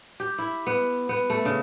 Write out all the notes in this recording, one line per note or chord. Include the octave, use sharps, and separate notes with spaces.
G4
E4
B3
B3
A3
C#3